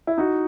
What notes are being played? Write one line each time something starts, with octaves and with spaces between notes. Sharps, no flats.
E4
D#4 F#4